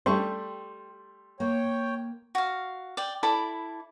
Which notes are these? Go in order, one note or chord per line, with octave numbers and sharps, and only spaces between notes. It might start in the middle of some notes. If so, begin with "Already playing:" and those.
G3 A3 G4 C6 C#6
A#3 C#5 G5
F#4 F5
D5 G5
E4 A4 D5 B5